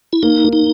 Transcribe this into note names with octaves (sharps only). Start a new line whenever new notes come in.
E4
A#3 D#4
A#3
D#4